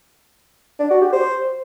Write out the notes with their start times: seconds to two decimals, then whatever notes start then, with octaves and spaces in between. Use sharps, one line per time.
0.79 D4
0.90 F#4
1.01 G4
1.12 C5